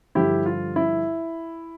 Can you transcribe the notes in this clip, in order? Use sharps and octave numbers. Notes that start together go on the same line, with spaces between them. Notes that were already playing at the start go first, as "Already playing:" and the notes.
G2 D3 F3 E4 G4
F4
E4